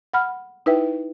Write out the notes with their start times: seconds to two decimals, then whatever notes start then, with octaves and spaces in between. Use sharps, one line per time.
0.14 F#5 B5 F6
0.66 D#4 E4 B4 E5 G5